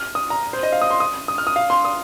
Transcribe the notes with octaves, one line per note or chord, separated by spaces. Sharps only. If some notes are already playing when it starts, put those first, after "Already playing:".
Already playing: F6
D#6
A#5
C5
D#5
F5
D#6
C6
D#6
D#6
F6
D#6
F5
C6
D#6